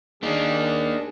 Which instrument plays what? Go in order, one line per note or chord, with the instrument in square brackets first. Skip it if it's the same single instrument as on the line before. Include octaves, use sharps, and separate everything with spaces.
[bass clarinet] D#3 [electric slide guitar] A#3 D#4 [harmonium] D4 G#4 A5